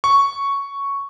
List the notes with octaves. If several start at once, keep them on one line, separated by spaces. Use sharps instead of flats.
C#6